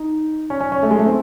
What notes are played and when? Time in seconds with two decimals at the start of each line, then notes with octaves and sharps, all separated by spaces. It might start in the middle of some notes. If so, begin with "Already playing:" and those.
Already playing: D#4
0.50 C#4
0.60 C#4
0.72 C#4
0.83 A3
0.91 G#3
0.99 A3
1.06 C4